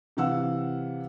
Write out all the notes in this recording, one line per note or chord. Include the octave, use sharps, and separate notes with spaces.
C3 E3 F5 F#5 E6